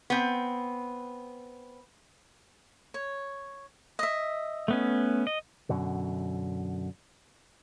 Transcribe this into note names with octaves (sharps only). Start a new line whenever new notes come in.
B3 C4
C#5
D#5 E5
A3 B3 C#4
D#5
F#2 B2 D3